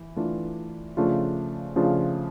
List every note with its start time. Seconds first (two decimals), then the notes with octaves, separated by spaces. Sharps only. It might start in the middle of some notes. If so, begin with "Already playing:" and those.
Already playing: E3
0.16 E3 A3 D4 F4
0.97 C#3 F3 A3 D4 F4
1.76 C#3 F3 A3 D4 F4